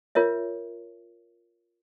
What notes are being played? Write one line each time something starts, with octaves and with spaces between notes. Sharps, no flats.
F4 A#4 C#5 E5